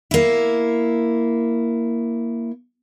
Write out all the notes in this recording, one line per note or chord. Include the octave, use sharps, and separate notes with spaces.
A#3 E4